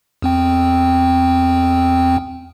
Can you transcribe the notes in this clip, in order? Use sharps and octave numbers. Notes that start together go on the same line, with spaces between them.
E2 C4 G5